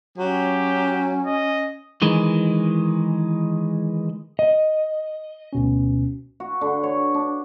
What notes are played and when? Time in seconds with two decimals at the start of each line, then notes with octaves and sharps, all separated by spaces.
0.18 F#3 C#4 G4
1.26 D#5
2.02 D#3 E3 G#3
4.39 D#5
5.53 D2 B2 C#4
6.40 F#4
6.61 D3
6.83 C#5
7.14 D4